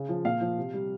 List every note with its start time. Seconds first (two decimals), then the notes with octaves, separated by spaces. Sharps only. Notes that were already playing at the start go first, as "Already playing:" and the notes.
Already playing: C#3
0.09 F3
0.25 A#2 F5
0.41 F3
0.58 C3
0.74 G3